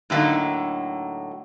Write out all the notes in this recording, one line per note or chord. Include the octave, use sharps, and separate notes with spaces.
A2 D3 F#3 A#3 D#4